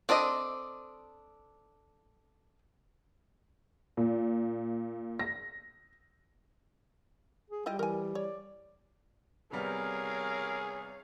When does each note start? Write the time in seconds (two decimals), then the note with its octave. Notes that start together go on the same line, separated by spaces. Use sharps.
0.09 C4 D4 A4 D#5
3.97 A#2
5.19 A#6
7.50 G#4
7.66 G3 E4 F4 D#5 G5
7.79 E3 A#4 G#5
8.15 C#5 D5
9.52 C3 G3 B3 G#4 A#4 C#5 F5